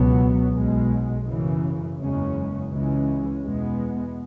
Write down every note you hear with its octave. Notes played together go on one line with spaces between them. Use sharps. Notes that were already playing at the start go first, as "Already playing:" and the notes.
Already playing: C#2 B2 F#3 B3
B1 B2 G#3
F#2 C#3 E3
F#1 E2 C#3 G#3 C#4
C#2 C#3 E3 G#3 C#4
E2 B2 G#3 B3